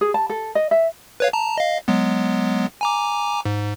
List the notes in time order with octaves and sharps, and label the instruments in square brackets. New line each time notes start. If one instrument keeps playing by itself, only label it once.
[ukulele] G#4
A5
A4
D#5
E5
[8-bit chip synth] B4 C#5 F5
A5 A#5
D#5 F5
F#3 G#3 B3
G#5 A#5 D6
G#2